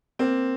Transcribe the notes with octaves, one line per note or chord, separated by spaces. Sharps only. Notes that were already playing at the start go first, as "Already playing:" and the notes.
A#3 C4